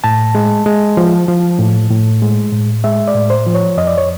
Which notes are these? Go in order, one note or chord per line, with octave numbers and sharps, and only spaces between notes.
A2 A5
G#3
G#3
F3
F3
A2
A2
G#3
A2
G#3 E5
D5
A2
C5
F3
C#5
F2 D#5
D5
C#5